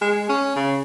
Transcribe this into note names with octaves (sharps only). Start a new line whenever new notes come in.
G#3
C#4
C#3